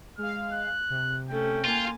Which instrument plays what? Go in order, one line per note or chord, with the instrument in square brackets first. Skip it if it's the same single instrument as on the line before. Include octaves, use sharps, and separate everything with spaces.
[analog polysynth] G#3 F5 [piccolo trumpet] F6
[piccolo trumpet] F#6
[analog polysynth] C3
[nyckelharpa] A3 C#4 [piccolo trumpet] G5
[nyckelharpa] A#3 G#5 [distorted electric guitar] F4